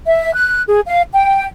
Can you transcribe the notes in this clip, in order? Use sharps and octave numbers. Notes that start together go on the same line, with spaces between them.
E5
F#6
G#4
F5
G5